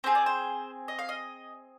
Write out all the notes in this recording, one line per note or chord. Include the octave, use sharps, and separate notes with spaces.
C4 F4 G#4 C5
D5
C5
D#5
F5
D#5